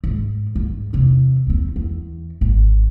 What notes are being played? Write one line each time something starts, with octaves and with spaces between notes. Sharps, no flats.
G#2
G#2
E2 C3
E2 C4
E2
G#1